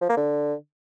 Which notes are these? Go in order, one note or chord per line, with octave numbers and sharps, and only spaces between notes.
F3
A#3
D3